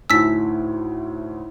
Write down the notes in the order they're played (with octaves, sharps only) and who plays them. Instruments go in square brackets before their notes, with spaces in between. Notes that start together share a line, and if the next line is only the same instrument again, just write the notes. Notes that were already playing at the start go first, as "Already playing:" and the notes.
[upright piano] D2 A2 [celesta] D#4 E4 [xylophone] E6 B6